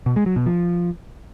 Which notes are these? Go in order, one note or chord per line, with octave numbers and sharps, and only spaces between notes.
B2
G#3
F#3
B2
F3